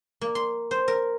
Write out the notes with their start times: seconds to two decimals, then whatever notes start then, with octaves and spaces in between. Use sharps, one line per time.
0.21 A#3
0.35 C6
0.71 C5
0.88 A#4